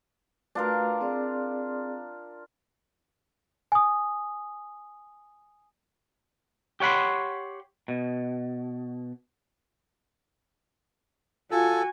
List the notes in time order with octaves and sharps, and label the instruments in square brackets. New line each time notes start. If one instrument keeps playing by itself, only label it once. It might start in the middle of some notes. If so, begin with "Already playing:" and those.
[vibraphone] A3 F#4 B4 [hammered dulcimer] D4 F4 A#4
[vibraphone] C4 G#4 D5
[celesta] G#5 D#6
[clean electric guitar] G4 C#5 F#5 B5 C6
B2
[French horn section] F4 [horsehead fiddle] F#4 G#5 [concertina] A4